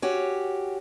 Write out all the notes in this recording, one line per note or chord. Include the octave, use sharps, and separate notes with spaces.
C#4 F#4 G4